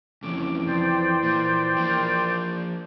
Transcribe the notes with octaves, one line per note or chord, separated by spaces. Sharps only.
F2 C#3 E3 D6
F2 C5 D5 G5
A#2
F3 A#3